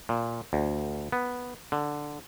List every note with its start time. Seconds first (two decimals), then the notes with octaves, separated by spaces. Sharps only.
0.09 A#2
0.53 D2
1.12 B3
1.72 D3